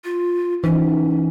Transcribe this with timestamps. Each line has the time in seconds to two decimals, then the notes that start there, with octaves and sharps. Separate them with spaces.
0.04 F4
0.64 E3 C#4 D#4